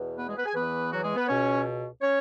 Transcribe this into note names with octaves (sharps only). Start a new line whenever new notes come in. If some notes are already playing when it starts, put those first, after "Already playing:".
Already playing: E2 B2
B3 B4
G#3 G#4
B3 B4
G#4 G#5
E2 E3 B3 B4
F#3 F#4
G#3 G#4
B3 B4
C#2 B2 C#4 C#5
C#4 C#5